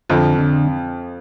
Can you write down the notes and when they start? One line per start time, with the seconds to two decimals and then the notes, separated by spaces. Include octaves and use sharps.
0.09 F2 D3 F3
0.39 D3